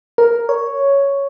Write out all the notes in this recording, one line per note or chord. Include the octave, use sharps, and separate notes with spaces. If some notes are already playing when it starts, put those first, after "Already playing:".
A#4
C#5